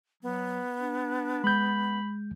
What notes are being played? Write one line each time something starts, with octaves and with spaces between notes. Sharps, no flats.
F#3 B3
D4
G#3 B5 G6